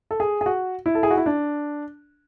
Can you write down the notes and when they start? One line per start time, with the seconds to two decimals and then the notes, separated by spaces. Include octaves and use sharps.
0.11 A4
0.20 G#4
0.41 G#4
0.46 F#4
0.86 E4
0.95 A4
1.03 G#4
1.11 F#4
1.17 E4
1.26 D4